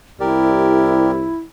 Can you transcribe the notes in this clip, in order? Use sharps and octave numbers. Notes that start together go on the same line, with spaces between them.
C2 E4 G4 A#4 D5